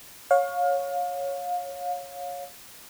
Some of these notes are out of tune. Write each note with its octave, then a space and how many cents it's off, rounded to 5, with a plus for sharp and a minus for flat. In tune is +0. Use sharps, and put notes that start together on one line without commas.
C#5 +0 F5 +30